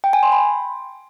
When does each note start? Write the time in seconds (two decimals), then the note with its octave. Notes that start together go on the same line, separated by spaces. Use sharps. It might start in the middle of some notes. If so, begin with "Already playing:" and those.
0.04 G5
0.13 G#5
0.23 C6
0.32 B5